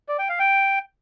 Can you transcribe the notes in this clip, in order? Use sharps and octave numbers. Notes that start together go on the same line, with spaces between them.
D5
G5
F5
G5